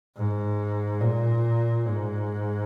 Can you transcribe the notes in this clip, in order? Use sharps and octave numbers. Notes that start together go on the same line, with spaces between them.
G#2
A#2
G#2